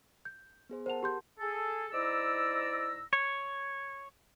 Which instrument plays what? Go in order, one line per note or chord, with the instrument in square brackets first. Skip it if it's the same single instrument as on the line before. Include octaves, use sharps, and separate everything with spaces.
[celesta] G6
[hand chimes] B3 G#4 C5
[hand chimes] A#4 F#5 A5 [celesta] C5 F7
[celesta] G4 C6 G6
[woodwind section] G#4 A4
G#2 E4 D5 A#5 E6
[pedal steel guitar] C#5